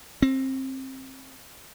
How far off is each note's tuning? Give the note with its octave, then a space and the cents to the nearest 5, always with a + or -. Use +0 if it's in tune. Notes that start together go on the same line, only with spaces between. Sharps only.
C4 +25